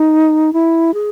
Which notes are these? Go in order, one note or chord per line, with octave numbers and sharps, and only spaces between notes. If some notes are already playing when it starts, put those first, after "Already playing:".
Already playing: D#4
E4
G#4